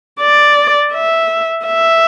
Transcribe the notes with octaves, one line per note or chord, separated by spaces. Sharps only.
D5
E5
E5